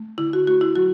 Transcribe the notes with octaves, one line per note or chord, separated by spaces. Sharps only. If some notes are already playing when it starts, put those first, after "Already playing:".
Already playing: A3
D3 E4
F#4
A3 F#4
E4
F#3 F#4